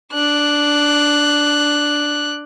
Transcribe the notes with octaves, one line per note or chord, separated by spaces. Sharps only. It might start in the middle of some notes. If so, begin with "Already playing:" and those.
D4 F#6